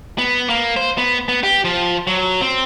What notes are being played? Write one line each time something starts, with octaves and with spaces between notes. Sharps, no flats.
B3
A#3
C5
B3
B3
G4
F3
F#3
C4